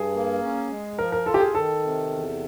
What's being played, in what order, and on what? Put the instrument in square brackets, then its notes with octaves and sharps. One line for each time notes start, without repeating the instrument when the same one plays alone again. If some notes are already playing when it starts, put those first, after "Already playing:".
Already playing: [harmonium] G2 [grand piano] G#4
[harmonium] A#3
C#4
G#3
[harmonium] F3 [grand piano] A#4
[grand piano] A#4
[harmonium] F4 [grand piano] A4
[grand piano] G4
G#4
[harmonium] D#3 [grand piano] A4
[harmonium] C3
E2